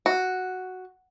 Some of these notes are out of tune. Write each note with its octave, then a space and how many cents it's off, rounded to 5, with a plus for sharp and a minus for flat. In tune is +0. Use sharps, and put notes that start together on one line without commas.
F#4 +0